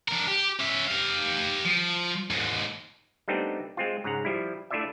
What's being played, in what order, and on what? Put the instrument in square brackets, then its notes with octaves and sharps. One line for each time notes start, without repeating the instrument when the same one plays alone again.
[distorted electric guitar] D4 A#4
G4
C#4 E5
G4 F5
F3
D#2 G#2
[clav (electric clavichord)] G3 A3 B3 C4 D4 D#4
G#3 C4 F4
G#2 C#3 F#5 A#5
F3 G3 E4
A3 D4 E4 F4 D5 E5